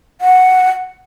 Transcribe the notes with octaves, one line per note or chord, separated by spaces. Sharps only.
F#5